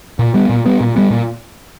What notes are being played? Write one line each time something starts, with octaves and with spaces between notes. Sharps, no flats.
A#2
G3 B3
A#2
G3 B3
A#2
G3 B3
A#2